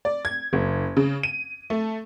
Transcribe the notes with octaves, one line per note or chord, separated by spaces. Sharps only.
D5
G#6
F#1
C#3
D#7
A3